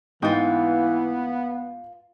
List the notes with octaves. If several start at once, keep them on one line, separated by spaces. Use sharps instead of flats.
G#2 E3 A#3 B3 F4 D#5 G5